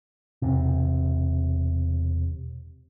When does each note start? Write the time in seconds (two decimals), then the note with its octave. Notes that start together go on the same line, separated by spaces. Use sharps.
0.42 E1 C3